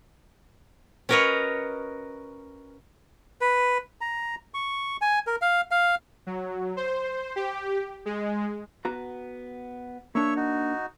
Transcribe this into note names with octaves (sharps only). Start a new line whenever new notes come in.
C#4 F#4 A#4 B4 C#5 D#5
B4
A#5
C#6
G#5
A#4
F5
F5
F#3
C5
G4
G#3
B3 F#4 A#5
A#3 D4 C#5 E5 C#6
D#4 F#4